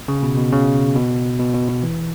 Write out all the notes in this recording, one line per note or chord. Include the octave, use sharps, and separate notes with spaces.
C#3
B2
B2
C#3
B2
B2
B2
B2
E3